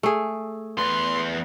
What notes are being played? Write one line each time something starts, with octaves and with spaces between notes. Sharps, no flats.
A3 G#4
E2 B4 C6